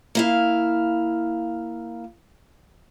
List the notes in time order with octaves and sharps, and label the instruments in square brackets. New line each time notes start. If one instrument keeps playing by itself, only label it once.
[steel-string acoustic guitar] A#3 E4 F5